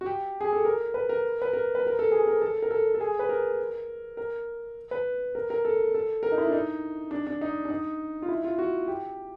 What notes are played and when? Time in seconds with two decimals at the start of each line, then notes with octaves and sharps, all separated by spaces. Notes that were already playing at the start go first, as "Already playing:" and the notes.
0.01 F#4
0.06 G4
0.41 G#4
0.53 A4
0.65 A#4
0.94 B4
1.09 A#4
1.42 B4
1.53 A#4
1.75 B4
1.87 A#4
1.99 A4
2.12 G#4
2.27 A#4
2.42 A4
2.62 A#4
2.71 A4
2.95 A4
3.01 G#4
3.19 B4
3.29 A#4
4.17 A#4
4.91 B4
5.35 A#4
5.50 A#4
5.65 A4
5.94 A4
6.23 A#4
6.32 D#4
6.38 E4
6.47 D4
6.53 D#4
7.11 D4
7.27 D4
7.41 D#4
7.65 D4
7.70 D#4
8.22 F4
8.29 E4
8.44 F4
8.58 F#4
8.88 G4